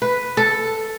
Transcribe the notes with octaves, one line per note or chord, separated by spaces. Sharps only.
B4
A4